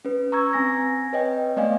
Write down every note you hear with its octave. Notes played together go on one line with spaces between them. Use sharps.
C#4 B4
A#5 C#6 E6 G#6
C4 G#5 A#6
B4 C#5 D#5 G5
A3 B3 D5 D#5 F5 G#5